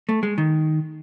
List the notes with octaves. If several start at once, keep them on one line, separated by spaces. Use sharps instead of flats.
A3
G#3
D#3